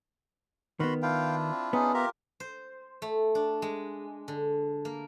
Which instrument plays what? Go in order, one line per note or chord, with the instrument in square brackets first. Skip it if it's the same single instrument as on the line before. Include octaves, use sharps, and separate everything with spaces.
[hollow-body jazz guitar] D#3 B3 [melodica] F#4 B5 C6
[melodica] D4 E4 F4 [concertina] F5 G5
[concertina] C4
[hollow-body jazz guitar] B3 [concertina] C#4 D#4 G#4
[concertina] F4 G4 A#4 [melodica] E5 A#5
[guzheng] C5
A3
D4
G#3
D3
A#3